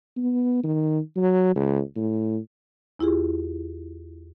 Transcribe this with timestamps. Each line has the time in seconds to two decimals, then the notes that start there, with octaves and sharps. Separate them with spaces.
0.17 B3
0.64 D#3
1.17 F#3
1.56 C#2
1.96 A2
2.99 E2 E4 F4 G4 G#4